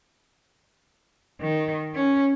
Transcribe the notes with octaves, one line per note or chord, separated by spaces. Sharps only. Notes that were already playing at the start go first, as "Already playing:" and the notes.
D#3
C#4